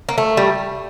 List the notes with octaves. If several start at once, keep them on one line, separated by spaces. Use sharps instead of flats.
A#3
A3
G3